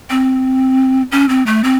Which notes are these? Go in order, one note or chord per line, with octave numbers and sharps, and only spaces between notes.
C4
C#4
C4
A3
C4